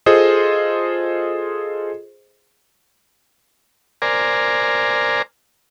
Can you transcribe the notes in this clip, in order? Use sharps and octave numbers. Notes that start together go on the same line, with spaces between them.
F4 G#4 A4 C5 D#5
A#4 C5 D5 G#5 A#5 F6